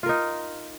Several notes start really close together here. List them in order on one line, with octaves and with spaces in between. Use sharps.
F4 A#4 D#4